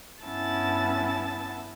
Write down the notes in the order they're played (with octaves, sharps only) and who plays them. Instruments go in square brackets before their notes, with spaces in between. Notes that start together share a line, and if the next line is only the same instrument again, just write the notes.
[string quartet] G2 B3 C#4 E4 A5 A6